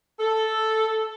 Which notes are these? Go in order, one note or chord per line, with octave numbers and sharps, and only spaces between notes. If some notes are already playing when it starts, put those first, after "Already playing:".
A4